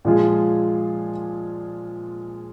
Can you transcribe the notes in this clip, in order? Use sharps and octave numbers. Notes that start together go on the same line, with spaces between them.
A#2 F3 G#3 F4 G#4